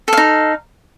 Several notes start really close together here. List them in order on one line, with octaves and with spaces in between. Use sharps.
A4 F5 D#4